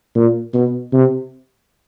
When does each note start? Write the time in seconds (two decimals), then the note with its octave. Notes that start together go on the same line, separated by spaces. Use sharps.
0.15 A#2
0.54 B2
0.93 C3